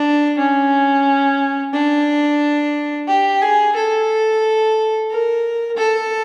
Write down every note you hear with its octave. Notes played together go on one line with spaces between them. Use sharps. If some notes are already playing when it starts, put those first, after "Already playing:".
Already playing: D4
C#4
D4
G4
G#4
A4
A#4
A4